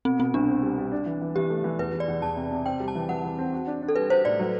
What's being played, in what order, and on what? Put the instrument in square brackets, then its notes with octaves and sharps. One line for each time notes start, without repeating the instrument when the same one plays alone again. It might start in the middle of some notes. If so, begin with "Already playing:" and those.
[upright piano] B2 [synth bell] C4
[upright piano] B2 [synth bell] C4
[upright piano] C2 [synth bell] D4
[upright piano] C4
G3
G3
D4
E3
E3
[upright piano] E3 [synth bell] G4
[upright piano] A3
E3
[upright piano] E2 [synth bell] B4
[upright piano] E2
[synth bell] D5
[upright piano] E2
[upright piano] E2 [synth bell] A5
[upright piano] C3
C3
[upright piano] C4 [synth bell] G5
[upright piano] G3
[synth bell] A5
[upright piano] E3
[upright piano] E3 [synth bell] F#5
[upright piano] E3
C4
F#4
D4
D4
[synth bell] A4
[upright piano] G3 [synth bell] B4
[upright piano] F#4 [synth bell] C5
[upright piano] A2 [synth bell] D5
[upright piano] F#3